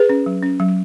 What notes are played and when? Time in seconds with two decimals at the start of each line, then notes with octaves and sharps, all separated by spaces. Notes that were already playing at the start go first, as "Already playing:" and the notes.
Already playing: G#4 B4
0.09 C#4
0.26 F#3
0.43 C#4
0.60 F#3